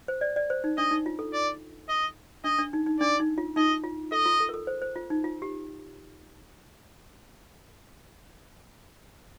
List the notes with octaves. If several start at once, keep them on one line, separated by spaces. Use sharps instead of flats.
C5
D5
D5
C5
D#4
D4 D#5
D#4
F4
A4
D5
D#5
D4 D#5
D4
D#4
D#4
D4 D5
D#4
F4
D#4 D#5
F4
A4 D#5
F4
A4
A#4
A4
C5
C5
F4
D#4
F4
G4